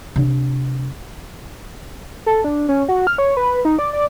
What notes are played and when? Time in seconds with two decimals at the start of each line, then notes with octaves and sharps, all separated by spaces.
0.16 C3 D4
2.26 A4
2.44 D4
2.69 C#4
2.89 F#4
3.07 F6
3.18 C#5
3.37 B4
3.65 D#4
3.79 D5
3.93 D5